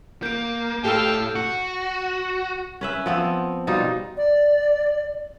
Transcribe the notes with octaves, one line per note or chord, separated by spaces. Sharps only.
A#3 G6 D7
A2 G4 A4 F5 G5 A5 E6
F#4
C#4 B4 E5
F3 B3 C4
B2 G3 D#4 F4
D5